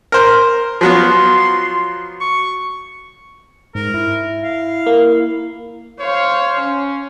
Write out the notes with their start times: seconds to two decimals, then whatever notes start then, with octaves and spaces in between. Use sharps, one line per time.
0.12 A#4 C5
0.81 F3 F#3 B3 C6
2.21 C#6
3.75 G#2 A#4
3.94 E4
4.43 F5
4.87 A#3
6.00 C5 C#5 F5
6.58 C#4